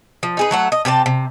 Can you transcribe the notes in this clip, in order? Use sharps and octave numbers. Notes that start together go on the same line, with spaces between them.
F3
D#4 G#4 B4
F#3 A3 F#5
D#5
C3 G4 A#4 A5
C3